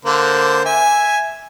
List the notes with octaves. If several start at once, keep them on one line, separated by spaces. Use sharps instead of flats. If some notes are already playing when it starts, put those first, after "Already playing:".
D3 A#3 C5
E5 G#5